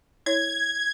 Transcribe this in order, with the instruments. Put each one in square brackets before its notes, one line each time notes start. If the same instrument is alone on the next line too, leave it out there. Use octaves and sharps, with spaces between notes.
[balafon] E4 C#5 [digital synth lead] G#6